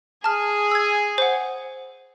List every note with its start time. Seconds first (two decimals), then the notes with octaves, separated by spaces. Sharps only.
0.24 G#4 A5 F6
0.71 E6 G#6
1.18 C5 F#5